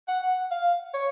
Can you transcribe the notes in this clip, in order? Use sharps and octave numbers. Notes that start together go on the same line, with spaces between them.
F#5
F5
C#5